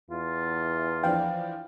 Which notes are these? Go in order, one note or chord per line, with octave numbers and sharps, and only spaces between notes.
E2 F4
E3 F3 D4 F5 G5